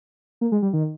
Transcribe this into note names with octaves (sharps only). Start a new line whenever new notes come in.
A#3
G#3
G3
D#3